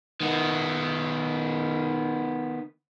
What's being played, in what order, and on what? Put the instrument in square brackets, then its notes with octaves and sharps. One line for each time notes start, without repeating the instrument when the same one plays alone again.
[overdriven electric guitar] D#3 B3